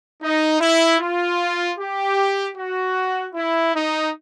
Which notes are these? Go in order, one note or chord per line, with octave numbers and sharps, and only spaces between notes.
D#4
E4
F4
G4
F#4
E4
D#4